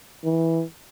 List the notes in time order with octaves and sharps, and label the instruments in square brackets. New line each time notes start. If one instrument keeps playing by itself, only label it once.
[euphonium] E3